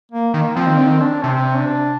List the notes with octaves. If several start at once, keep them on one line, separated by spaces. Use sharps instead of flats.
A#3
D#3 A#3
F3 C4
D#3
D3 C4
D#3
D4
C3 C4
D4